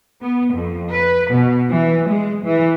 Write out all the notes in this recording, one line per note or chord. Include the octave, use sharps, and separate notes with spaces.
B3
F2
B4
B2
E3
G#3
E3